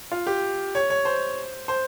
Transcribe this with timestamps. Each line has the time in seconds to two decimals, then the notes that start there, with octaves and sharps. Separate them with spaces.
0.12 F4
0.27 G4
0.75 C#5
0.90 C#5
1.05 C5
1.68 C5